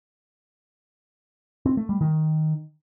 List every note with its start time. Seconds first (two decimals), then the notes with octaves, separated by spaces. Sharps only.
1.66 C4
1.77 A3
1.89 G3
2.01 D#3